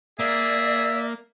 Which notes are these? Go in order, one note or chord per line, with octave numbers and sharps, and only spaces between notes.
A#3 G#4 D5 E5